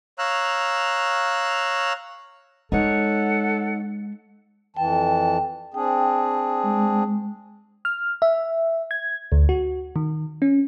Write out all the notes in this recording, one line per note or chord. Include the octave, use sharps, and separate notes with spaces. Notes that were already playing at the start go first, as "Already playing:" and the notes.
C#5 F5 A#5 E6 F#6
G#3 D#4 A4 C#5 F#5
F2 E3 G5 A5
C4 D4 G#4 G5
G#3
F6
E5
G#6
D2
F#4
D#3
C#4